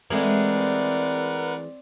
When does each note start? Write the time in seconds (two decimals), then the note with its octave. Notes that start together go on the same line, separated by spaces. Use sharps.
0.10 E3 G#3 A3 C4 A#4 B4 D5 F#5